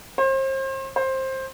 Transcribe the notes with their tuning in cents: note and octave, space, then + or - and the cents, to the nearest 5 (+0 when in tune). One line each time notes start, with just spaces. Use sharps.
C5 +35
C5 +15